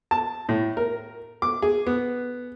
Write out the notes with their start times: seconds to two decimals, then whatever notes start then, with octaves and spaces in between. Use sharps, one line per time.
0.11 A5
0.49 A2
0.77 A#4
1.42 D6
1.62 G#4
1.87 B3